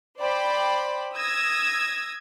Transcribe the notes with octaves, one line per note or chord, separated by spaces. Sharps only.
C5 D5 G5 B5
D#6 E6 G#6 A#6